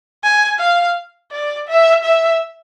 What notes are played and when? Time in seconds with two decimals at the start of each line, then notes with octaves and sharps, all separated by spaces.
0.23 G#5
0.60 F5
1.31 D5
1.68 E5
2.04 E5